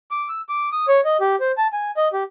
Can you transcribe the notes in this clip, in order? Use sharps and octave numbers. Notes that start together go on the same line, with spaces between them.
D6
E6
D6
D#6
C#5
D#5
G4
C5
A5
G#5
D#5
G4